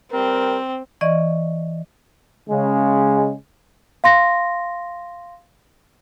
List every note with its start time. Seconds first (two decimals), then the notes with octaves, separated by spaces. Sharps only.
0.12 G3 C4 A#4
1.01 E3 D5 D#5 C#6
2.49 C#3 G#3
4.04 F5 C6 A#6